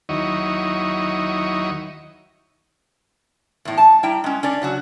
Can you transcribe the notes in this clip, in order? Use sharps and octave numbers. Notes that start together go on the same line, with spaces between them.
D#2 D#3 F#3 E4 D#5 C#6
E2 A2
A5
G3 E4 G5 A#5
G#3 C#4
C#4 D4 D5
C#3 F#3 F#4